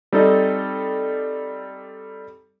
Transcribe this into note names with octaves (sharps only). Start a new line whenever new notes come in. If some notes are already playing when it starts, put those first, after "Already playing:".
G3 C4 D#4 A4 D5 D#5